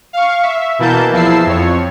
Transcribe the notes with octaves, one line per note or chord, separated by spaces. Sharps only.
F5 C#6
E5
B2 E3 A#3 A5 G6
E2 F3 E4 A5 E6 C7
F2 C#5